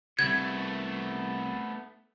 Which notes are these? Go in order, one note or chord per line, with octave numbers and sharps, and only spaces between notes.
C2 C3 A3 B3 G#6